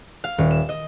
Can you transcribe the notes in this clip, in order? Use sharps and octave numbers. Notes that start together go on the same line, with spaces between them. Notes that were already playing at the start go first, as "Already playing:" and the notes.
F5
D#1
E7
D#5